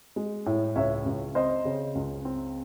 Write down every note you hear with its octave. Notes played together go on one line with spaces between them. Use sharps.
G#3
A2
C#2 C#5 E5
C#2
C4 C5 D#5
C#3
C#2
C4